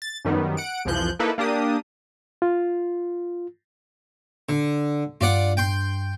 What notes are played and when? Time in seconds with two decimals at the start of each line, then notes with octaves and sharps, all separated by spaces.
0.02 A6
0.25 F#2 D#3 G3 B3
0.57 F#5 D7
0.85 C2 F2 E3 F3 F#6 G6
1.19 A#3 D#4 E4 A4 B4
1.38 A#3 D4 G4 D#6
2.42 F4
4.49 D3
5.21 G2 F4 D5 F#5
5.57 G5 C6